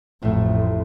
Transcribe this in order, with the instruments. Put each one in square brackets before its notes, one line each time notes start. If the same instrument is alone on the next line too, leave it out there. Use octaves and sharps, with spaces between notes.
[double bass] A1 F2 [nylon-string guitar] A2 A3